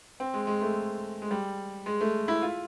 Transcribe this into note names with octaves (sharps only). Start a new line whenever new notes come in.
C4
G#3
G#3
A3
G#3
G3
G#3
A3
E4
F4